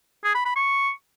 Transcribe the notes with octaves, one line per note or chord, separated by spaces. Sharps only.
G#4
B5
B5
C#6